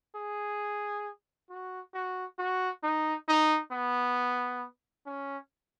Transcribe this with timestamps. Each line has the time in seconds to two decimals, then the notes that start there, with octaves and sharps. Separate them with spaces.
0.16 G#4
1.50 F#4
1.94 F#4
2.39 F#4
2.83 D#4
3.28 D#4
3.72 B3
5.06 C#4